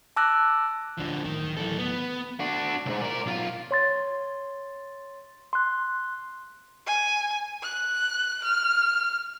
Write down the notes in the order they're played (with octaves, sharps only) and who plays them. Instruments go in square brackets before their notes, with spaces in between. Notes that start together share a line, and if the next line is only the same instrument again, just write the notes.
[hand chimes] A5 D6 E6 F#6 A#6
[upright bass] D1 D2 [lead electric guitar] D3 F3
[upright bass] A2 [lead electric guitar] D#3
[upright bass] D1
[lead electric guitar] E3 A4
B3
D4 F#4
C#2 G#2
A#4 D5
B1 F4
[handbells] C#5 C6 A6
C6 F#6
[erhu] G#5
F#6
F6